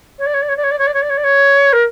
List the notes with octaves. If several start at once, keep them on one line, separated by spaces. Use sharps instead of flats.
C#5
D5
C#5
D5
C#5
D5
C#5
D5
C#5
D5
C#5
D5
C#5
D5
C#5
A#4